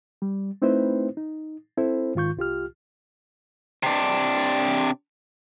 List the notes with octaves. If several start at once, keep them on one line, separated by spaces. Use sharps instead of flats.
G3
A3 C4 D#4 E4 B4 C5
D#4
C4 E4 A4 C5
G#2 D#3 F4 C#6 G6
C2 F4 G4 F6
C3 D4